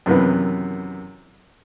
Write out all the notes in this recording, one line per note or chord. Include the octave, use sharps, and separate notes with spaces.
F#2 C3 D#3 E3 B3